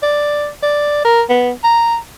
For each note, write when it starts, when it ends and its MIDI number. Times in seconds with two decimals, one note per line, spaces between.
0.02 0.48 74
0.63 1.01 74
1.05 1.22 70
1.29 1.51 59
1.64 1.97 82